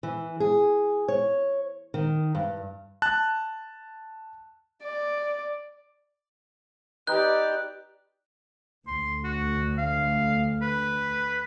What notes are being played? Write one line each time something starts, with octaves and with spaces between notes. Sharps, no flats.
E3
G#4
C#5
D#3
G2
A5 F#6
D5
D#4 G4 B4 D5 G5 F#6
D2 C6
F#4
F5
B4